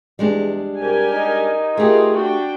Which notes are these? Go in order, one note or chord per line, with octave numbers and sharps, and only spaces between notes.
E2 G3 G#3 D4
C2 G4 A#4 G#5
D#4
A3 F4 G4 G#4 A#4
D4 F#4 G5